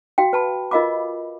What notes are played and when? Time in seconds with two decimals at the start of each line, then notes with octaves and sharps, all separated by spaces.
0.18 F#4 F5 G5
0.33 B4 A5 B5
0.71 F4 A#4 D#5 F5 B5 D6